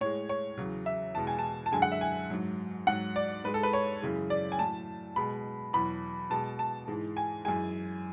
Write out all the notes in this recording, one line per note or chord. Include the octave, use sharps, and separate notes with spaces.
A2 G#3 C#5
C#5
E2 C#3 F#3
E5
E2 B2 G#3 A5
G#5
A5
A5
F#2 D3 G#3 G#5
F#5
E5
G#5
G#2 F#3
G#2 F#3 F#5
D5
G#2 G#3 B4
A4
B4
C#5
F#2 C#3 E3 G#3
D5
G#5
A2 F#3 A5
B2 G#3 B5
E2 B2 F#3 B5
B2 G#3 A5
A5
G#2 E3 G#3
G#5
F#2 E3 G#3 G#5